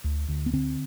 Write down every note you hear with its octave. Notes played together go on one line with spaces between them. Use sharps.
D2
D2
B3
D3 C4